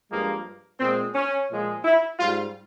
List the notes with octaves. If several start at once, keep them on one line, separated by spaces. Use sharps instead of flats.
G2 F3 G#3 A#3
A#2 G#3 C4
C#4
A#2 F3 G#3
E4
G#2 G3 F4